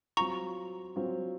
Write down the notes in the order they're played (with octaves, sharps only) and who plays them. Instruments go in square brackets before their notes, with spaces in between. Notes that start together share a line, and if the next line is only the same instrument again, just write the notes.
[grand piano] F#3 C4 F4 [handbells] A#5 C#6
[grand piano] F#3 C4 F4